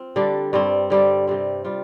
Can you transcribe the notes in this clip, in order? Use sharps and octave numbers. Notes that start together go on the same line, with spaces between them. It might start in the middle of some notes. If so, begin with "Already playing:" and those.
Already playing: C4 F4
D3 G3 D4 G4
G2 G3 C4
D3 G3 C4 G4
C3 G3 C4
G3 F4